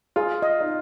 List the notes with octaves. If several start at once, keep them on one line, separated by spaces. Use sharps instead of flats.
F4 G#4
D#5
D#4